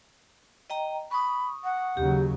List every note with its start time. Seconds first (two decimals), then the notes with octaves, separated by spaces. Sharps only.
0.70 D#5 G5 A#5
1.11 B5 C#6 D#6
1.64 F#5
1.97 D#2 C#3 F#3 G4